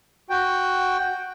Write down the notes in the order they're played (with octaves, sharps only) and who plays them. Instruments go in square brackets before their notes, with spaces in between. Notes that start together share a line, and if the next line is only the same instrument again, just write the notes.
[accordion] F#4 G5